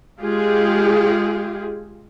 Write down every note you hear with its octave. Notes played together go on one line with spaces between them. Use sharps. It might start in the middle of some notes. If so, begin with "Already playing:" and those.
G#3 F4 G4 G#4